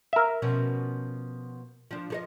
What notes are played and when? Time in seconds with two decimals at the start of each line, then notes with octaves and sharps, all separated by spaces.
0.13 A#4 E5
0.42 B2 F3 C#4
1.91 F3 D4
2.10 F3 A4 D#5